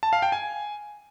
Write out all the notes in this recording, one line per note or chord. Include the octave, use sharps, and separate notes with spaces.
A5
F5
G5
G#5